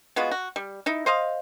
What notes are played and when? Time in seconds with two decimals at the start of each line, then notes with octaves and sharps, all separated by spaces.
0.16 G#3 B3 F4 F#4
0.31 F#4
0.56 G3
0.86 D#4 E4
1.06 C5 D#5 F5